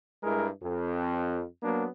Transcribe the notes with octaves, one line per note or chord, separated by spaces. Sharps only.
G2 G#3 E4 A#4
F2
F#3 A#3 B3 D4